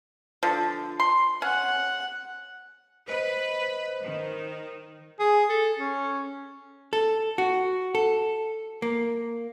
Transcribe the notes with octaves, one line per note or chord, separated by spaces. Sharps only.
D3 F3
C6
C#4 F#5
B4 C5 D#5
D#3
G#4
A4
C#4
A4
F#4
A4
A#3